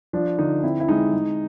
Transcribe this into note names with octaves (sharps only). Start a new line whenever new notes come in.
F3 D4
D3 D#4
C4 E4
E4
G#3 D#4
G#3